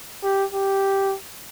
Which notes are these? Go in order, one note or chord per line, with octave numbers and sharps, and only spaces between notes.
G4
G4